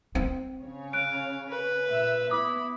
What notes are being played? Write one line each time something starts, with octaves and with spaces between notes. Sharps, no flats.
C4
C#3 C#5
F5 F#6 D7
B4
A#2 E5
B3 E4 B5 D6 D#6